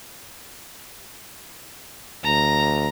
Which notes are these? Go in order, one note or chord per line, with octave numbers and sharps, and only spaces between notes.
D2 A#5